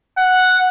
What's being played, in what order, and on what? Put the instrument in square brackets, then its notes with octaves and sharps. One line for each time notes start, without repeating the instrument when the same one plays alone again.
[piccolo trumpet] F#5